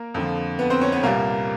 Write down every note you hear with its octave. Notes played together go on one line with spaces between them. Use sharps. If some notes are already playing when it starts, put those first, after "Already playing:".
Already playing: A#3 A#4
F2 D3 F3
B3 B4
C4 C5
C#4 C#5
B3 B4
C2 A#2 G3 A#3 A#4